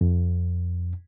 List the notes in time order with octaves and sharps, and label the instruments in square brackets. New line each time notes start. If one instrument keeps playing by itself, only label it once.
[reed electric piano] F2